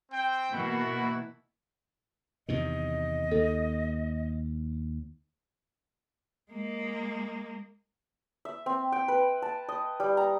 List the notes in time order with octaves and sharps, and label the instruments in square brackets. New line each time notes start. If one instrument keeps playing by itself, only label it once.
[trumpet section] C4 G5
[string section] B2 E3 A#3 [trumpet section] E4 F#4
[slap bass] E2 C3 D#3 [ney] D#5
[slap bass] D#2 [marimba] A4
[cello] G#3 A#3
[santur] E5
C4
G5
B4
A5
D#5
G3
A#5